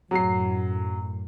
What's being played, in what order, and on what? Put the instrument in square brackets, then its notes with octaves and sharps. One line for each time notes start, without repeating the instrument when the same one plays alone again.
[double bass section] F#2 A2 [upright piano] F#3 C7